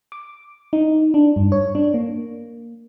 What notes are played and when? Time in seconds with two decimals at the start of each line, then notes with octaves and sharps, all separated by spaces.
0.12 D6
0.73 D#4
1.14 D4
1.36 G2
1.52 C#5
1.75 D4
1.94 A#3